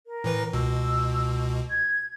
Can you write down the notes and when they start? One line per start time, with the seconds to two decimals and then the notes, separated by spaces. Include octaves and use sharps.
0.07 A#4
0.24 A2 E3 B4
0.53 C#2 B2 E6
1.70 G#6